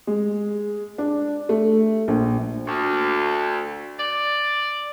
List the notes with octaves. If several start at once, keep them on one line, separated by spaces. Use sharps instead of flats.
G#3
D4
A3
A#1
D2
D5